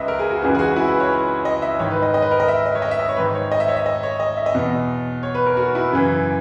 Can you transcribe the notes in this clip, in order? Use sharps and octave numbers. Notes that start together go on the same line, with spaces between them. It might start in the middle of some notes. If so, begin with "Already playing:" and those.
Already playing: C#2 C#3 B4 D#5 E5
A#4
G#4
F#4
C#2 C#3 E3 G#4
G#4
F#4
E4
B4
C#5
D#5
E5
G#2 D#3 C#5
B4
D#5
D#5
B4
A#4
D#5
E5
D#5
C#5
D#5
E5
D#5
C#5
G#2 D#3 B4
C#5
D#5
E5
C#5
E5
D#5
C#5
D#5
E5
D#5
E2 B2
C#5
B4
A#4
F#4
E4
F#2 C#3 E3